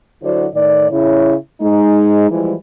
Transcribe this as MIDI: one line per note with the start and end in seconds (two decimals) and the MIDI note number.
0.23 0.46 50
0.23 0.46 54
0.23 0.46 64
0.23 0.46 66
0.23 0.46 72
0.23 0.46 74
0.53 0.87 45
0.53 0.87 51
0.53 0.87 74
0.90 1.34 49
0.90 1.34 64
0.90 1.34 73
1.61 2.26 56
1.61 2.26 63
2.31 2.53 52
2.31 2.53 53
2.31 2.53 55
2.31 2.53 56
2.31 2.53 64